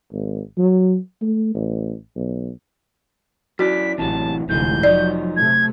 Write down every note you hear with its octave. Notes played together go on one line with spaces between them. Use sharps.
G#1
F#3
A3
A1
B1
F#2 E4 F#4 D5 B6
A1 C3 E3 F#3 A5
F1 D2 G#2 E3 G#3 G6
F3 F#3 D#4 D5
C3 A3 G#6